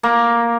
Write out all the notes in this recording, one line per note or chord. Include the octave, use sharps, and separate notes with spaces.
A#3